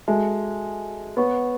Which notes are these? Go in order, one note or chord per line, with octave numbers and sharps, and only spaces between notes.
G#3 F#4 A4 E5 A5
B3 C#5 F#5 C#6